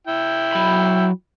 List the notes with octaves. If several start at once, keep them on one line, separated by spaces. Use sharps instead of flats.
E4 G5
F#3 B5